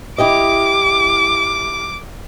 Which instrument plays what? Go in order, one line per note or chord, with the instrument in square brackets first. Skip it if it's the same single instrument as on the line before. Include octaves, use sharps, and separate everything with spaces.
[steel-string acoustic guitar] E4 G4 D#5 [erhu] D6